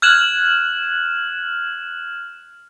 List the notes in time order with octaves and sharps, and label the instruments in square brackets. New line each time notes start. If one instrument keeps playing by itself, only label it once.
[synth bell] F6 F#6 G#6 E7 F#7